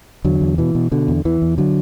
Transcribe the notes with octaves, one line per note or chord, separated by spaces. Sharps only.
E2 D3 F#3
E2
B2 E3
B2
B2 D3
E2
E2 E3
E2
D3 F#3